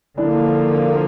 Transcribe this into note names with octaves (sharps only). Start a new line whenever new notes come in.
D3 F3 A#3 D4 E4